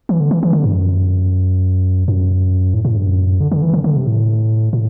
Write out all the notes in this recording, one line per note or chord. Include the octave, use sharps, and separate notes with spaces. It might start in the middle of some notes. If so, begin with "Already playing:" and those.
E3
D3
E3
E3
D3
G2
F#2
F#2
A2
A2
G2
F#2
D3
D3
E3
D3
D3
C3
A2
A2